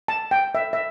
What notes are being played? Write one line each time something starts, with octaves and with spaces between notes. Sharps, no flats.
A5
G5
E5
E5